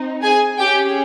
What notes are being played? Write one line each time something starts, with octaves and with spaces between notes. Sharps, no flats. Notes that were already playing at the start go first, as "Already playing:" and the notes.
Already playing: C4 D#4
G#4 G#5
C#4 G4 G#4 G5